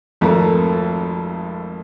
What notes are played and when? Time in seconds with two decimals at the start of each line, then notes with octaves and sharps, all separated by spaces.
0.21 G#1 F2 A3 A4 A#4 A#5